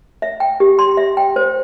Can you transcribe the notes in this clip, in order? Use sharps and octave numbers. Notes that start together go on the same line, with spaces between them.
E5
G5
G4
C6
E5
G5
C5